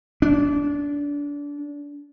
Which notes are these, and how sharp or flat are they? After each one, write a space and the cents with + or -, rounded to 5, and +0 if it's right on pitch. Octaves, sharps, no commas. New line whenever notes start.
D4 -25